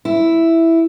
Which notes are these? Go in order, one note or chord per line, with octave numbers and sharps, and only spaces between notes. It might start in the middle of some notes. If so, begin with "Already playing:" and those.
E4